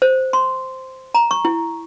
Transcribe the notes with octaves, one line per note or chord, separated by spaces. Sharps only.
C5
C6
A#5
C#6
E4